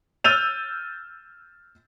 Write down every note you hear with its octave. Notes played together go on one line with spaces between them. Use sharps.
E6 F6 G6 A6 D#7 F7